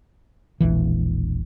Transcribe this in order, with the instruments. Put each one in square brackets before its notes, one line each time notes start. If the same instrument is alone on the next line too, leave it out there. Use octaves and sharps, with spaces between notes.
[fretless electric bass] E1 A#1 E3